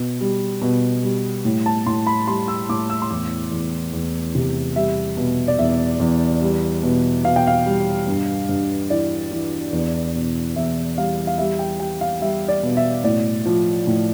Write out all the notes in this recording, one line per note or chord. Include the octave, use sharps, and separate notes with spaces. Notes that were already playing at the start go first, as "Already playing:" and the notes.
Already playing: B2
G3
B2
G3
A2
A5
A2 C6
B5
G3 C6
E6
A2 D6
E6
C6
E2 D6
E2
E2
C3
G3 E5
B2
D5
E2 E5
E2
G3
B2
B2 F5
G5
F5
G3
G2
G2
E3 D5
E3
E2
B2
E2 E5
G3 F5
F5
G3 E5
G5
G3 G5
F5
G3 E5
D5
B2
E5
A2 D5
F3
A2